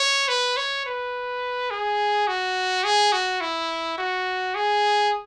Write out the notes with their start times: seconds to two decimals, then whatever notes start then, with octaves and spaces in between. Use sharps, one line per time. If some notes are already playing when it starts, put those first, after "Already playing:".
Already playing: C#5
0.28 B4
0.57 C#5
0.86 B4
1.71 G#4
2.28 F#4
2.84 G#4
3.13 F#4
3.41 E4
3.98 F#4
4.55 G#4